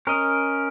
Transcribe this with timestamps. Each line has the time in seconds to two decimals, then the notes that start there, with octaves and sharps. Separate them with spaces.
0.07 C#4 A#4 D#5